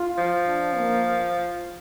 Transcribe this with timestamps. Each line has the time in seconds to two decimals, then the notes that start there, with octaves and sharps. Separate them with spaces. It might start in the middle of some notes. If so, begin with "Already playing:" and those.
Already playing: F4
0.18 F3
0.47 D4
0.76 A#3